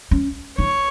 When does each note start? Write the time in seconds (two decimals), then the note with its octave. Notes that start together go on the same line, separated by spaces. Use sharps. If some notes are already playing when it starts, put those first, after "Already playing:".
0.11 C#4
0.58 D#4 C#5